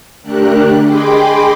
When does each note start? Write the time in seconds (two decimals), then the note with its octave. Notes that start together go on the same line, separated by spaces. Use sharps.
0.23 D3 A3 D4 G4 A#4 F#6
0.84 G#4 D#5 G5 B5 C6 D6